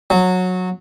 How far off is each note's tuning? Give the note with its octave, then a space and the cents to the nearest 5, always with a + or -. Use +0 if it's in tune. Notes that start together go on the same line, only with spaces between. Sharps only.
F#3 -15